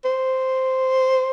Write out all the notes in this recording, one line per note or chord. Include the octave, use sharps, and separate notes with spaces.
C5